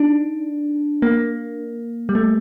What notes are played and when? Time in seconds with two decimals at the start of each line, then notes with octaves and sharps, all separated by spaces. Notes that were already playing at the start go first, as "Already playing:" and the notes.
Already playing: D4 D#4
1.02 A#3
2.09 G3
2.15 A3